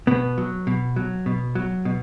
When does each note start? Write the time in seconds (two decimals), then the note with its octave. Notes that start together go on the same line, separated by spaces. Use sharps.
0.07 B2 B3
0.38 F#3
0.67 B2
0.96 F#3
1.26 B2
1.55 F#3
1.85 B2